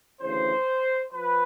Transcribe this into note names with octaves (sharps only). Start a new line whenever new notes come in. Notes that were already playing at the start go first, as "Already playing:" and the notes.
D2 C#3 E3 C5
F3 B4